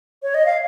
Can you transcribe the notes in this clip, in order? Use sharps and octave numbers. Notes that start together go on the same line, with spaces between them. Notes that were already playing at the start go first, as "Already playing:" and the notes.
C#5
D#5
F5